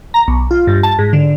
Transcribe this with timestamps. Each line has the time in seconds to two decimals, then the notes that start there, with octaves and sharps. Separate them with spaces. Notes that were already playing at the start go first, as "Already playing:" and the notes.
0.14 A#5
0.28 B1
0.51 F4
0.67 G2
0.83 A5
0.99 G#2
1.13 D3